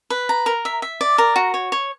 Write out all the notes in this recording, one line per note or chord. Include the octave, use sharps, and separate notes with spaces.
B4
A#5
A#4
E5
E5
D5
A#4
F#4
C#5
C#5